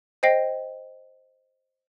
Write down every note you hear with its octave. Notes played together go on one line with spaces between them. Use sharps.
C5 D#5 G5 A#6 C7